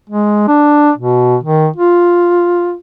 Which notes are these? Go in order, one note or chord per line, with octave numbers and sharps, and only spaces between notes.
G#3
D4
B2
D#3
F4